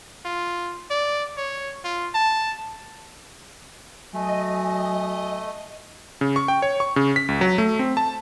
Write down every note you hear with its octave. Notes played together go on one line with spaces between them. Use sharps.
F4
D5
C#5
F4
A5
F#3 A3 D#5 G#5
C#3
C#6
G5
C#5
C#6
C#3
B6
C#2
F#3
A3
C4
A5